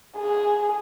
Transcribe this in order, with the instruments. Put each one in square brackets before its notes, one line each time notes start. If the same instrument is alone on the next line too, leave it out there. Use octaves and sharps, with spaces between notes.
[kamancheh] G#4